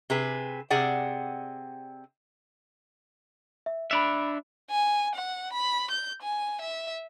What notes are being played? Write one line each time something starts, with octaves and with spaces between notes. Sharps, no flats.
C3 G#4 B4
C3 C4 G#4 D5 F#5
E5
D4 E5 B5 D7 F7
G#5
F#5
B5
G6
G#5
E5